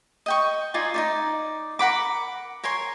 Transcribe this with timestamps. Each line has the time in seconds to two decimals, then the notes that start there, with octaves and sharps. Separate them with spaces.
0.26 D#5 G5 C#6
0.74 D#4 F4 D5 G#5
0.94 D#4 E4 D5
1.79 A#4 F#5 B5 D6
2.64 A#4 C#5 G#5 C6